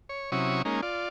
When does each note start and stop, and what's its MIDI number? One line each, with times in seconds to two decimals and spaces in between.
0.09 0.31 73
0.32 0.62 48
0.32 0.62 54
0.32 0.62 61
0.32 0.62 64
0.32 0.62 85
0.32 0.62 87
0.65 0.81 56
0.65 0.81 58
0.65 0.81 61
0.65 0.81 63
0.82 1.09 65
0.82 1.09 74